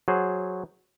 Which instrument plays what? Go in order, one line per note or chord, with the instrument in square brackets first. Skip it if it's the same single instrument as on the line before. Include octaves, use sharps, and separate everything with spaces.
[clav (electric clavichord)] F#3 G#4 C5